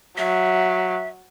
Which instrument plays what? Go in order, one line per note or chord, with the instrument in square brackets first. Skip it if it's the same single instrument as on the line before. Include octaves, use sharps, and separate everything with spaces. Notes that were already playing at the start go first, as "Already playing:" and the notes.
[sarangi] F#3 [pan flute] E5